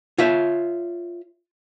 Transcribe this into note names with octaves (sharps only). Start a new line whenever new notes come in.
F4 C#5 E5